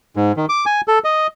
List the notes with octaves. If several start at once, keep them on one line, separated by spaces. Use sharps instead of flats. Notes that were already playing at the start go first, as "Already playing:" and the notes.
G#2
D#3
D6
G#5
A4
D#5